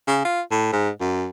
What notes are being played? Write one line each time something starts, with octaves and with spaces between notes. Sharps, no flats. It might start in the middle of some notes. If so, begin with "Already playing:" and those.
C#3
F4
A2
G#2
F#2